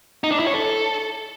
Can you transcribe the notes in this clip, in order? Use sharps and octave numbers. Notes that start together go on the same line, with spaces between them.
D#4
D4
E4
C#5
A4